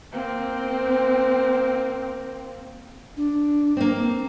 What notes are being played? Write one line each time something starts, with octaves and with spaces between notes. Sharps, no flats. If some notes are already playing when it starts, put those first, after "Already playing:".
A#3 C4
D4
A#3 C4